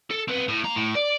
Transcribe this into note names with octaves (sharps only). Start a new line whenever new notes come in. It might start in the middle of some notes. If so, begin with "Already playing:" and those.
A4
C4 B4
A2
A#3 A#5
A2
D5